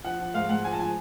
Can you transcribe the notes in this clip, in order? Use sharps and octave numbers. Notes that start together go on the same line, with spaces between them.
F3 F#5
F3
G#2 F5
G#2 F#5
F3 G#5
A5
F3 G#5